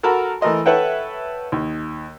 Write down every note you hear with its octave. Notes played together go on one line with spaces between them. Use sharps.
F#4 A4 A#4 A5 B5
E3 A3 A#4 D#5 C6
A4 B4 C#5 E5 F#5 G5
D#2